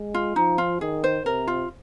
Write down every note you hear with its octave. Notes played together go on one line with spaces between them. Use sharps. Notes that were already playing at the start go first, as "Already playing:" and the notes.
Already playing: G#3
F4
F3 D#4
F4
D#3 G#4
C5
C3 A#4
F4